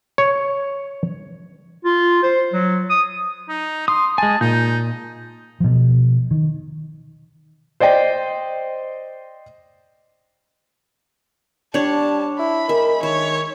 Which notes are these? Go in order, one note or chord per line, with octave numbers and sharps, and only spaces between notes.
C#5
F4
C5
F#3
D#6
D#4
C6 D#6
G#3 G#5 A5
A#2 D#4 G6
B2 F3
D#3
C5 D5 D#5 G5
G3 D4 C#5 A5
E4 B5
G#3 A#4 E5
D#3 C#5 E5